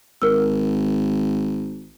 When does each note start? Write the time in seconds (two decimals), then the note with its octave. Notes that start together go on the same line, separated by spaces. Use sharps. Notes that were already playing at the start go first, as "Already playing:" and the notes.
0.22 G#1 A#4 E6